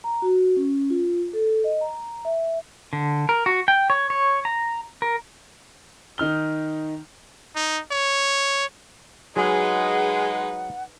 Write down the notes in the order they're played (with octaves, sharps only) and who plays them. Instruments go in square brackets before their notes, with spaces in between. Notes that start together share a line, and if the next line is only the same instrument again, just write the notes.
[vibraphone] A#5
F#4
C#4
F4
A4
D#5
A#5
E5
[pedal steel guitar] D3
A#4
F#4
G5
C#5
C#5
A#5
A#4
[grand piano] D#3 D#4 F6 G7
[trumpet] D#4
C#5
[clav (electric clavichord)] F#3 G#4 [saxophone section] G#3 [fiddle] D#4 B4 [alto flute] F#5